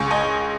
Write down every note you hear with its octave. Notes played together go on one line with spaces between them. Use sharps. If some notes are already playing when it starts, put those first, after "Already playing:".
Already playing: C#2 G#5 C#6
D#5 G#5